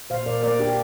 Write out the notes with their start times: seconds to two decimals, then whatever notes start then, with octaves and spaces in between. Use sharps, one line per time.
0.10 A#2 C5 F5
0.26 A#2 A#4 D5
0.43 A#3 A#4 D5
0.59 D4 G4